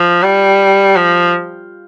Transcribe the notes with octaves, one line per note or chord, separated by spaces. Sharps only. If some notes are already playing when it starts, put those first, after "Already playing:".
Already playing: F3
G3
F3